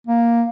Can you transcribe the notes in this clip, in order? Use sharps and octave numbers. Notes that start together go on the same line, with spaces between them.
A#3